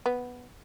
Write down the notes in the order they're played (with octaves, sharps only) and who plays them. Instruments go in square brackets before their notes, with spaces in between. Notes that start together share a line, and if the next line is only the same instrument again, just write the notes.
[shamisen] B3